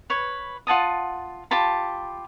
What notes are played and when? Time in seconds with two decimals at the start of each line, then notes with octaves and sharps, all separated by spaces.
0.10 B4 C#5 B5
0.67 F4 F#5 A5 D#6
1.51 F4 G4 A5 B5